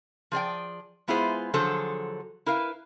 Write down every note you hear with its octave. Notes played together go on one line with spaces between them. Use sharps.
F3 G#4 D5 G5
G#3 B3 E4 F4 G#4 C5
D3 F3 F#3 G#4 A4 C5
E4 A#4 B4 F5